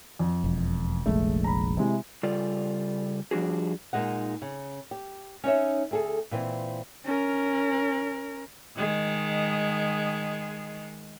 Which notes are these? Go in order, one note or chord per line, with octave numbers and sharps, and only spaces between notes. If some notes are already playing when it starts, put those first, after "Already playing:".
F2
E1
F1 A#1 G#3 A3
A#5 B5
C3 G#3 E4
C#3 G3 F4 A4 D5
F3 G3 D4 F#4 G#4
A#2 G#3 D#4 F#5
C#3
G4
C#4 D#4 C#5 E5
D2 G#4 A4
A#2 E3 C4
C#4 A#4
D#3 G#3